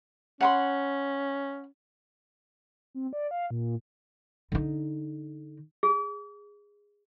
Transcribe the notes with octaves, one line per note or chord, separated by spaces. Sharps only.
C#4 F#5 B5 C6
C4
D5
F5
A#2
D3 D#4
G#4